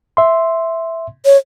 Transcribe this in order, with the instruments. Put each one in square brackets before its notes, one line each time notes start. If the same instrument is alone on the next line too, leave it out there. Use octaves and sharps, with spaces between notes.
[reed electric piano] E5 C6
[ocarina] C#5